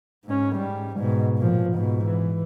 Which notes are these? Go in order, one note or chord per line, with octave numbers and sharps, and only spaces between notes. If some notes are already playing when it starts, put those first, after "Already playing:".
G#2 C#4
G#2 G3
G#2 B2
A#2 F3
G#2 B2
E3